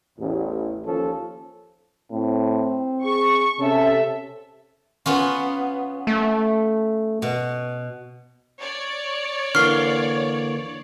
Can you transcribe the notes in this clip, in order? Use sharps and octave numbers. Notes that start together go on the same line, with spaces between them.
A1 E2
D#2 F3 C#4 A4
A2 C4
G#4 C#6
C3 C#4 A4 E5
B3 C#4 F4
A3
B2
C#5 D5
D3 E3 A#3 C#6 F6 C7